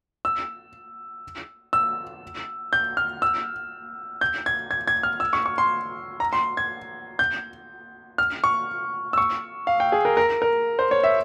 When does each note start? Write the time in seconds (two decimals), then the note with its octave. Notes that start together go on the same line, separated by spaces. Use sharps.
0.25 E6
1.73 E6
2.73 G6
2.97 F6
3.22 E6
4.21 G6
4.46 G#6
4.71 G#6
4.88 G#6
5.03 F6
5.20 E6
5.33 C#6
5.46 C#6
5.58 C6
6.20 A#5
6.33 C6
6.57 G#6
7.19 G6
8.18 F6
8.44 C#6
9.13 E6
9.18 C#6
9.67 F5
9.80 G5
9.92 G#4
10.05 A#4
10.17 A#4
10.42 A#4
10.79 C5
10.91 C#5
11.04 E5